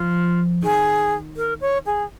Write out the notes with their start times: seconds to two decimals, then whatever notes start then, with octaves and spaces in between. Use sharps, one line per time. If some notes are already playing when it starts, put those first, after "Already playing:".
Already playing: F3 F4
0.62 D#3 G#4
1.37 A#4
1.61 C#5
1.86 G#4